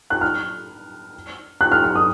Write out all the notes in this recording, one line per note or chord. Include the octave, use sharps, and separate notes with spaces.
F#6
F6
F#6
F6
F6
D#6